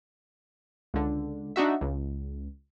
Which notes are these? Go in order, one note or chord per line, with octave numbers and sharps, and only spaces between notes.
C#2 D3
D4 D#4 F#4 E5
C#2